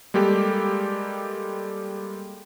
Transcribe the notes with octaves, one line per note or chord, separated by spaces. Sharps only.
G3 G#3 A#3 G4 A4